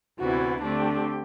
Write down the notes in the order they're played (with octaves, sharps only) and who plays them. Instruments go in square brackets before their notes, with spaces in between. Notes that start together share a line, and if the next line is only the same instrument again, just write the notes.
[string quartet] D2 C3 E3 B3 E4 [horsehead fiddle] F#4
[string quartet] D3 A3 C4 G4 [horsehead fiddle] D4